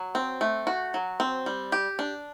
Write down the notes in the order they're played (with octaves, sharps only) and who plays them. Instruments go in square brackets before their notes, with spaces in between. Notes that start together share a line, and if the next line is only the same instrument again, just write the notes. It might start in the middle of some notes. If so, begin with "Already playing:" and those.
Already playing: [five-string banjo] F#3
C4
A3
F#4
F#3
C4
G3
G4
D4